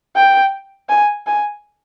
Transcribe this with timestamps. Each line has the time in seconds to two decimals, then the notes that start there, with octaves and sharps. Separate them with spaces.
0.16 G5
0.89 G#5
1.27 G#5